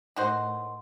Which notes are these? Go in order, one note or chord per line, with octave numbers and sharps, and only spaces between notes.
A2 D#3 F#4 C5